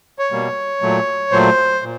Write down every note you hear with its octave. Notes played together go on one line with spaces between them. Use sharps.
C#5
B2 G3 A#3
A#2 F#3 A3
A#2 F#3 A3 C5
A#2